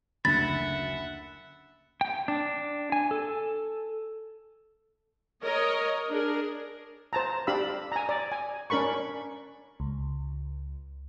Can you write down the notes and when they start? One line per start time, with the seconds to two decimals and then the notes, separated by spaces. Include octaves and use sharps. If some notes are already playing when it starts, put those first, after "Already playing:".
0.25 F#1 D2 E5 F#5 B5 A6
2.01 G5
2.28 D4
2.92 G#5
3.11 A4
5.43 A#4 C#5 D#5
6.09 D4 G#4 A#4
7.13 C5 A5 A#5
7.47 D4 G4 F5 B5 E6
7.92 G#5 A#5
8.09 D5
8.32 G#5
8.70 C#4 D4 A#4 B5 C#6
9.80 C#2